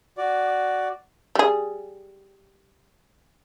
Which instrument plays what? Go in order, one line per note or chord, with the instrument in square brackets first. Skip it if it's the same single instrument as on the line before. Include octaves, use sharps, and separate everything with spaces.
[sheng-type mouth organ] F#4 D5
[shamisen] G3 G#4